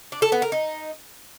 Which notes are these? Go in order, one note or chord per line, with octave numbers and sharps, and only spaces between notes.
D4
A4
B3
A#4
D#4